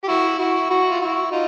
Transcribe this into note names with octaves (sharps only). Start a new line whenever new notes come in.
G4
E4 F#4
E4 F#4
E4 F#4
F4
E4 F#4
D#4 F4